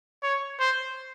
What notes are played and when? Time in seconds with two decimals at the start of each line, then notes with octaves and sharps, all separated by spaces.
0.23 C#5
0.60 C5